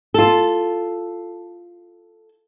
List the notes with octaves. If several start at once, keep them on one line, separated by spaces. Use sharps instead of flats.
F4 A4